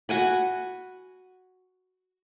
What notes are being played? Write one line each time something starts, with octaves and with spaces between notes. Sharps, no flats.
F#4 F#5 G#5 B5